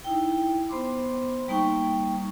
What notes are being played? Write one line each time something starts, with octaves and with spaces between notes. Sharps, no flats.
D#4 E4 G5
B3 C5 B5 C6 D6
G3 A#3 D#4 G5 C#6